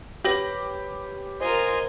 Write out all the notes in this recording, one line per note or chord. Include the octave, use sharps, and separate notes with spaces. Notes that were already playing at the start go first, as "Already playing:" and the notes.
G4 B4 C#5 B5 A#6 F#7
F4 A#4 C5 D#5 G#5 C6